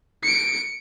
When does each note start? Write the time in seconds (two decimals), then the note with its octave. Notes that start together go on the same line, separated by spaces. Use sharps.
0.23 C#7 D7